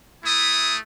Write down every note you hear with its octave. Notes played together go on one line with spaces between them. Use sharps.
A3 E4 D#6